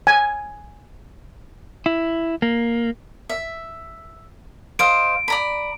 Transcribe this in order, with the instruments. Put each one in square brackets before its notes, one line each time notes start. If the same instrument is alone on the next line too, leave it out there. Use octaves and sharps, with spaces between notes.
[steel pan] G#5
[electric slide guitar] E4
A#3
[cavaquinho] E5
[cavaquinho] C5 D#5 F5 [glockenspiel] D7
[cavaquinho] D5 A#5 B5